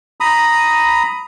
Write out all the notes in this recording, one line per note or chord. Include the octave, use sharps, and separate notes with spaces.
A#5 B5 D#6